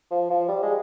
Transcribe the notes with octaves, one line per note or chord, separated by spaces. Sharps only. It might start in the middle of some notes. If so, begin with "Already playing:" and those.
F3
F3
G3
G#3